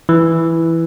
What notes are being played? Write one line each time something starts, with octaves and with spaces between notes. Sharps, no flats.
E3